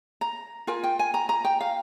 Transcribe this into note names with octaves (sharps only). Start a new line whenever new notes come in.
A#5
F4 A#4 G#5
G5
G#5
A#5
A#5
G5
F5